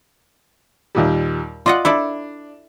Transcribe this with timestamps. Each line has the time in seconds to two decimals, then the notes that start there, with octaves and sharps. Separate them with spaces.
0.95 D#2 A#2 G3
1.66 F4 D5 D#5 F#5
1.85 D4 E4 A4 D5